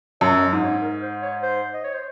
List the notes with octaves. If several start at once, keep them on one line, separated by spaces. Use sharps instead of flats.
F#2 C#5
D#5
G#2
C#5
A#4
C5
C#5
C5
D#5
C#5
C5